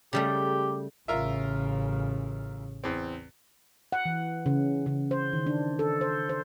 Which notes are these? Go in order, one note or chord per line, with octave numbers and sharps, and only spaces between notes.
C#3 G3 A3 G4
A1 C#3 F4 A#4 E5
E2 C4
F#5
E3
C#3
C#3
C5
D#3
D4
A4
C5
C5